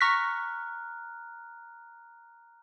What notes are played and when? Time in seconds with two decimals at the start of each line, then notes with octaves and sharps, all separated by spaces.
0.01 A#5 C#6 F6 F#6 A#6 B6